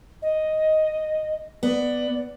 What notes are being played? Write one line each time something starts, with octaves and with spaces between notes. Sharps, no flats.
D#5
B3 D5